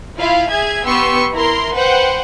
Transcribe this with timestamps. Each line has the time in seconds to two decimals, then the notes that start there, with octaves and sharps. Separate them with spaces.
0.17 E4 F4 F5
0.48 G#4 E5 G#6
0.85 B3 G4 C6 C#6 E6
1.33 E4 A#4 A#5 C6
1.74 B4 C5 F#5 G5